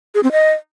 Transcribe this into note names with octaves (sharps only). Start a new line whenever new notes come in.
G#4
C4
D#5